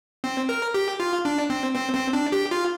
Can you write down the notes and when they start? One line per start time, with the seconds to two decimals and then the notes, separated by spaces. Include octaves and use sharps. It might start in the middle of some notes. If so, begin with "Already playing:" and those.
0.24 C4
0.49 A#4
0.74 G4
1.00 F4
1.25 D4
1.50 C4
1.75 C4
1.94 C4
2.13 D4
2.32 G4
2.51 F4